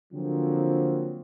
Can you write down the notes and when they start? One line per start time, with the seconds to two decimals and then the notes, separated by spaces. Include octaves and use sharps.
0.13 D3 F3 F#3 A#3 C4